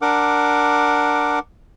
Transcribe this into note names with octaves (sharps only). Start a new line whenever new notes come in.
D4 A#4 F#5 D6